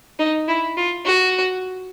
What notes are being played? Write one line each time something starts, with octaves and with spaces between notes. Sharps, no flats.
D#4
E4
F4
F#4